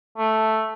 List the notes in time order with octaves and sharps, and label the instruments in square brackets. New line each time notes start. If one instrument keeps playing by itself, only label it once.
[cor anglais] A3